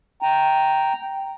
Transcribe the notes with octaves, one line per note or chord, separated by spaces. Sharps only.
G5 A#5